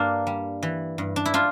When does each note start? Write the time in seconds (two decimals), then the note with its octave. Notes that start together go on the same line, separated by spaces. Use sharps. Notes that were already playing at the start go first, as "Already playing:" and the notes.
Already playing: G2 A#3 D4
0.27 G3
0.63 E3
0.98 G2
1.16 D4
1.26 E4
1.34 D4 F4